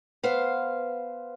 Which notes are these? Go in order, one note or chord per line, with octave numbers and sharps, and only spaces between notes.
B3 C5 F5